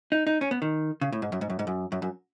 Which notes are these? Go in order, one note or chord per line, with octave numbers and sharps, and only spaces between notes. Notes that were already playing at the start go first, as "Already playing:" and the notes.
D#4
D#4
C#4
B3
D#3
C#3
A2
G#2
F#2
G#2
F#2
G#2
F#2
F#2
F#2